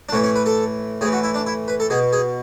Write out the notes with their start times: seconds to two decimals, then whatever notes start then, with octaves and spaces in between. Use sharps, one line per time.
0.09 D4
0.12 A2 E3 C#4
0.24 C#4
0.36 B4
0.46 A4
1.01 A2 G#4
1.05 E3
1.13 F#4
1.24 E4
1.34 D4
1.47 E4
1.68 B4
1.80 A4
1.90 B2 G#4
2.13 G#4